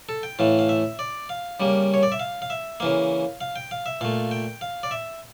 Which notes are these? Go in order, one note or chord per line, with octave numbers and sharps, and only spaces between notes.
A4
G5
A2 E3 A3 F5
F5
E5
D5
F5
C#3 G3 A#3
C#5
D5
E5
F5
F5
E5
C#3 E3 A#3 F5
F5
G5
F5
E5
A#2 A3 F5
G5
F5
D5
E5